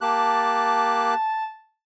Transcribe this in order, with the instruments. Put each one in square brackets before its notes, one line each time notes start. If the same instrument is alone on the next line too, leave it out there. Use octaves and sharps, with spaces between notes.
[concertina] A#3 G4 F#6 [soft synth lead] A5